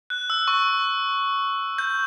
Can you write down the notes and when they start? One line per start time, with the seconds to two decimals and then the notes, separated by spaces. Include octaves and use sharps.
0.10 F#6
0.30 E6
0.48 C#6
1.78 G6